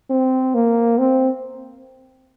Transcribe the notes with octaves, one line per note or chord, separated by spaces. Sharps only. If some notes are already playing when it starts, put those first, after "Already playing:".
C4
A#3
C4